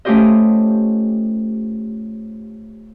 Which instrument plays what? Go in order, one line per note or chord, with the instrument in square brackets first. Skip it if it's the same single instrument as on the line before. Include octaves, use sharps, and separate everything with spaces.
[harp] A3 C#4 F4 G4 C5 D#5